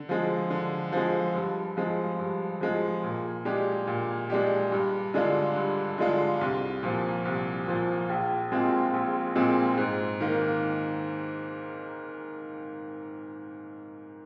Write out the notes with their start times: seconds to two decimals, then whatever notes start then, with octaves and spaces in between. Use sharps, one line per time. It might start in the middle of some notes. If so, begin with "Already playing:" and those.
Already playing: D3
0.09 F3 G#3
0.50 D3
0.92 F3 G#3
1.34 G2
1.77 F3 G#3
2.19 G2
2.61 F3 G#3
3.03 A#2
3.45 G#3 D4 G4
3.87 A#2
4.30 G#3 D4 G4
4.72 G2
5.14 D3 G#3 D4 F4
5.56 G2
5.98 D3 G#3 D4 F4
6.41 C2
6.83 A#2 F3
7.25 C2
7.67 A#2 F3
8.09 A#1
8.51 A#2 G#3 C4 F4
8.93 A#1
9.36 A#2 G#3 C4 F4
9.77 G#2
10.20 D#3 A#3